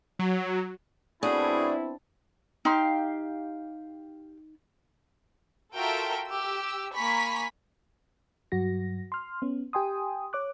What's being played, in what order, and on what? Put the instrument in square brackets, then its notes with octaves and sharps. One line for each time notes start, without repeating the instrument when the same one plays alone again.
[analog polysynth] F#3
[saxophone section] A2 F#4 G#4 [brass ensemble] B3 C4 E4 [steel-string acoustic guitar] D4
[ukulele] D#4 [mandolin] G4 F5 C6
[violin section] F4 F#4 A4 A#4 E5 G5
G4 E6
A#3 G#5 A#5 B5 C#6 B6
[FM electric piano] G2 F#3 F#4 A#6
C6 F6
B3 C#4
G4 G5 G#5 C6 D#6
C#5 D6 F#6